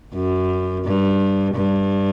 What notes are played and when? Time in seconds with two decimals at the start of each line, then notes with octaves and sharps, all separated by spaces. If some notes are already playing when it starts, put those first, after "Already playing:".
0.14 F#2
0.85 G2
1.55 G2